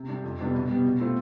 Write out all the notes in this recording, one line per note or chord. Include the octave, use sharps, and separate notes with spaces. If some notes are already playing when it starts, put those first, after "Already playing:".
Already playing: C3
G3 D4 G4
F2
C3 G3 B3 D4
B2
G3 B3
B2
A3 C4 F4